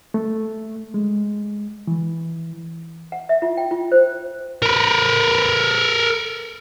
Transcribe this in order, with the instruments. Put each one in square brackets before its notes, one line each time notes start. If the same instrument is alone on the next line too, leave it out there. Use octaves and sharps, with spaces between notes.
[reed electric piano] A3
G#3
E3
[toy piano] F#5
E5
F4
G5
F4
C5
[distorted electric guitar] A#4 B4